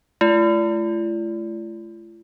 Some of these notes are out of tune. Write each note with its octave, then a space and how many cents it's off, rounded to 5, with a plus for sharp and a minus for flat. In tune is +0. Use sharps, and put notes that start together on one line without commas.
A3 -35 F4 -45